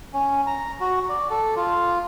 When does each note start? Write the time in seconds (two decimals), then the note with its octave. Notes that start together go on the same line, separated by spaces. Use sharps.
0.14 C#4
0.47 A#5
0.81 F#4
1.09 D5
1.30 A4
1.57 F4